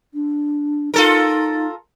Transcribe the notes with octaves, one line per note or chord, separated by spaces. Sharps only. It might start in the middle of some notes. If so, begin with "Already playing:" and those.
D4
D#4 F4 A4 A#4